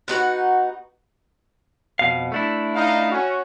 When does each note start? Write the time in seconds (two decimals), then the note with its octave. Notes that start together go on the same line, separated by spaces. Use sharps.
0.08 B3 D#4 F#4 F#5
1.99 F2 B2 F5
2.32 A3 D4 E4
2.75 D#4 F5
3.11 C#4 F#4